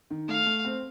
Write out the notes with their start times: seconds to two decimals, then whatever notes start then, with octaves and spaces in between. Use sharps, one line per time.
0.10 D#3
0.28 A3 F5
0.46 A3
0.65 C4